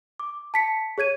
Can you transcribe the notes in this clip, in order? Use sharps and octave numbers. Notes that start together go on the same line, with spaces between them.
D6
A5 B6 C#7
G#4 C#5 G#6 D#7